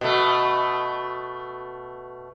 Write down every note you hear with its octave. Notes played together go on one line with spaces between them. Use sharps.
B2 A3